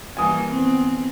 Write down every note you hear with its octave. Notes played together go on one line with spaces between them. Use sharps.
E3 G3 A#3 G#5 D#6
B3 C4